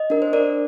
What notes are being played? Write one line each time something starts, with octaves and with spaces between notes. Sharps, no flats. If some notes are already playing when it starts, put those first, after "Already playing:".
Already playing: D#5
D4 A#4
C5
D4 A#4 D5